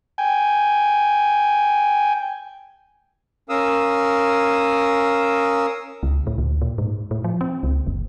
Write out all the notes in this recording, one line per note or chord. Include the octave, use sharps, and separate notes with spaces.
G5 G#5
C#4 A#4 F5 D#6 E6
C#2
A2
D2
A#2
G#2
A2
F3
C4
C#2
F#1